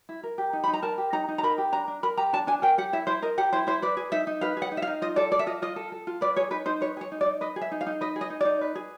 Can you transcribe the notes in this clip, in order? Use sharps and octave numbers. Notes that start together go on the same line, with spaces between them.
E4
A#4
G4
D#4
D#4 B5
A#5
A#4 A5
G4
D#4 A#5
D#4
A#5
A#4 B5
G4
D4 A#5
D4
A#4 B5
G4 A#5
D4 A5
D4 G#5
A#4 G5
G4 F#5
E4 E5
E4 C5
A#4 D#5
G4 F#5
E4 C5
E4 C5
B4 D5
G#4
D#4 E5
D#4
B4 F5
G#4
F#5
D#4
E5
F5
D#4
F4 D#5
A4 D5
A4 D5
E5
F4 D#5
F4 D#5
A4
A4
F4
B4 D5
G#4 C#5
D#4 B4
D#4 C5
B4 C#5
G#4 C#5
D#4
D5
D#4
B4 D#5
G#4
E5
D#4
F5
D#4
B4 D#5
G#4
D#5
D#4
D#4 D5
B4
G#4